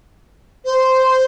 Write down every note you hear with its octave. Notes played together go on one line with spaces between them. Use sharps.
C5